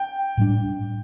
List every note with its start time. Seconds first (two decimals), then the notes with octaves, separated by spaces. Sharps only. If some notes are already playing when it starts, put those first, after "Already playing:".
Already playing: G5
0.37 A2 G3 A#3 D4